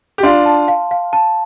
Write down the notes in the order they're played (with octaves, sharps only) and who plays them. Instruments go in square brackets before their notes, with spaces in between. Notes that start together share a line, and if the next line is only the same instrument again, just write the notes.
[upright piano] G4
[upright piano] D4 F4 [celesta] C6
[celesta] A5
F5
F5
A5